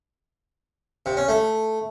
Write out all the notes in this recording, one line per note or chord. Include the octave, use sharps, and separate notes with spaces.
C3
C#4
A3